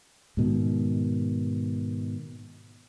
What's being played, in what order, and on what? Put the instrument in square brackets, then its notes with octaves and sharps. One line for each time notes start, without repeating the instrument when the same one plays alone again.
[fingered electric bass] G#2 B2 D#3